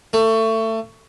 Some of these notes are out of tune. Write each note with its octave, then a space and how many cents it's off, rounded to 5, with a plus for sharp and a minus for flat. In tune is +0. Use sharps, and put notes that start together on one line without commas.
A3 +25